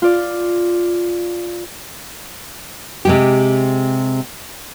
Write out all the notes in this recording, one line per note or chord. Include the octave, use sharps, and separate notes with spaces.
F4 D5
C3 G#3 G4